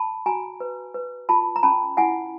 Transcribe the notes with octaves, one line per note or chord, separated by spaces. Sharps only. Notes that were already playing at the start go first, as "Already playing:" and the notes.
Already playing: A5 B5
F#4 G#5 A#5
B4
B4
F4 A5 B5
A#5
C#4 A5 B5
E4 F#5 G#5